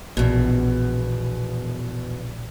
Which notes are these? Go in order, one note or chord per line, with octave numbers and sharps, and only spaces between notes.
A#1 E2 B2